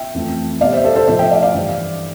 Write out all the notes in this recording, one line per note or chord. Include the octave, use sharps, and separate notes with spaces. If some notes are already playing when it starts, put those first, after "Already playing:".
Already playing: E5 G5
F2 E3 A3
B2 G3 D5 F5
C5 E5
A4 C5
A4 C5
A2 F3 A3 C5 E5
E5 G5
D5 F5
D5 F5
G2 E3 G3